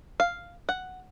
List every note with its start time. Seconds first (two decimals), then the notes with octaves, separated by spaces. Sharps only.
0.20 F5
0.69 F#5